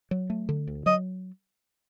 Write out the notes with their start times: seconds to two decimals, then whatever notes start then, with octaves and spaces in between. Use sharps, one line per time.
0.11 F#3
0.30 A3
0.49 D3
0.67 D2
0.86 F#3 D#5